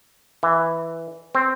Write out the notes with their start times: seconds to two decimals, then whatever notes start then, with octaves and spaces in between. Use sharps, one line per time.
0.43 E3
1.35 C4